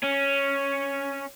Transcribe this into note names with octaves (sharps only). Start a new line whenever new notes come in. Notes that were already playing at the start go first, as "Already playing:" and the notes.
C#4